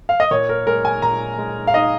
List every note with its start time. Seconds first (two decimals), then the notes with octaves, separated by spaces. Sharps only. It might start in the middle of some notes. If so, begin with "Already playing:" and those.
0.09 F5
0.20 D#5
0.31 A#2 C#5
0.49 A#4
0.67 G#3 A#4
0.85 G#5
1.02 A#2 A#5
1.38 G#3
1.67 F5
1.74 D#4 D#5